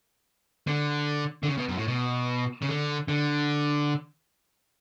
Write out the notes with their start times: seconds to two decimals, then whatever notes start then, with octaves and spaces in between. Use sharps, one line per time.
0.67 D3
1.43 D3
1.48 C#3
1.57 B2
1.68 F#2
1.77 A2
1.88 B2
2.62 C#3
2.69 D3
3.08 D3